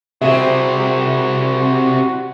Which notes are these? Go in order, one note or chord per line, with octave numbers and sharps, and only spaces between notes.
C3 C4 E4 F#4 G#4 E5